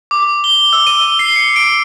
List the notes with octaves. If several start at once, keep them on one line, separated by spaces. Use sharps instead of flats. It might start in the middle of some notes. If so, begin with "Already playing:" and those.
D6
G7
E6
D#7
C7
C#7
D7